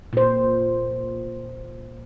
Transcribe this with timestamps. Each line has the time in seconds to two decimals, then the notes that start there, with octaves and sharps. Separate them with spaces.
0.13 A#2 C5